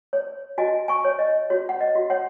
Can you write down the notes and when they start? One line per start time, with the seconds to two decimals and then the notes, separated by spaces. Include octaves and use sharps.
0.13 C#5
0.58 F#4 D#5 G#5
0.88 G#5 C#6
1.05 C#5
1.19 D#5
1.50 F#4 C#5
1.69 F#5
1.81 D#5
1.95 F#4
2.10 C#5 F#5